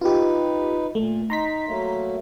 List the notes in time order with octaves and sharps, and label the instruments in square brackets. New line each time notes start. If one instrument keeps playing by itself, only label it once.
[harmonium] D#4 B4 [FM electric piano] F4 G4
[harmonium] A#2 [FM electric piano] A3
[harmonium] D#4 [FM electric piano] A#5 C6 B6
[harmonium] F#3 A3 A#3